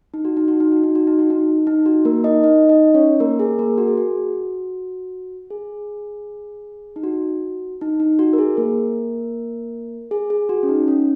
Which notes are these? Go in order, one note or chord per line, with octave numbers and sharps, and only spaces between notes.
D#4
F#4
D#4
F#4
D#4
F#4
D#4
F#4
D#4
F#4
D#4
D#4
F#4
A#3 A#4
D#4 D#5
D#4 D#5
D#4 D#5
C#4 C#5
A#3 A#4
G#4
A#3 A#4
F#4
G#4
F#4
G#4
D#4
F#4
D#4
D#4
F#4
A#4
G#4
A#3 A#4
G#4
G#4
F#4
C#4
D#4
C#4